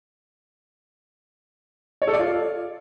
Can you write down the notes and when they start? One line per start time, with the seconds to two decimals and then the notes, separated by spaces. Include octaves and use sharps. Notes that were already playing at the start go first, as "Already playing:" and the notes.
2.02 C#5
2.07 A4
2.13 D5
2.19 F4